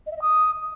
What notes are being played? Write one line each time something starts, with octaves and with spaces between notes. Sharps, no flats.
D#5
E5
D#5
D#6